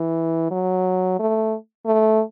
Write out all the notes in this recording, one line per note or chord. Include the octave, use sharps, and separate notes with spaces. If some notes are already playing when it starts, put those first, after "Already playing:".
Already playing: E3
F#3
A3
A3